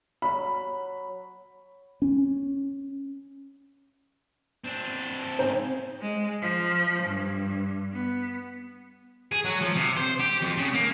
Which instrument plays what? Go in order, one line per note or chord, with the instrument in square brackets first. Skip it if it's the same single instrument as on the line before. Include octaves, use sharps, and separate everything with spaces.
[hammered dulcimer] F#3 [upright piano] B5
[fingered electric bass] C#4
[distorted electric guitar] C4 D4
[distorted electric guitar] G#2 C#3 [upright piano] C4 D#4 C5
[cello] G#3
F3
G2
B3
[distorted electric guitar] G#4
F#3
F3
C3
C5
G4
F2
C#3
A#3